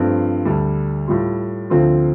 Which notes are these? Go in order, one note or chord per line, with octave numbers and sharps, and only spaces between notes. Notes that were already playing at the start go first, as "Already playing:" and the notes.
Already playing: G2 F3 A3 C4
D2 D3 G3 D4
A2 G3 F4
D2 D3 F3 C4 F4